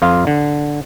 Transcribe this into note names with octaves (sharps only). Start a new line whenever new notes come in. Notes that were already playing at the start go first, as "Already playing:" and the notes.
F2 F4 F5
D3